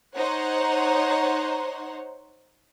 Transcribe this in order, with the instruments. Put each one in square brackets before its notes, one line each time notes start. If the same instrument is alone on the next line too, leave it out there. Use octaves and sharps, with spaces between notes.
[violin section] D#4 C5 C#5 F#5